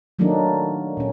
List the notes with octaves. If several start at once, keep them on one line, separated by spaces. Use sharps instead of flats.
D#3 F#3 A3 A#3 D4 D#4
A#2 C#4